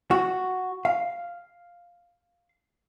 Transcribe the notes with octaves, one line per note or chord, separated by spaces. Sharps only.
F#4
F5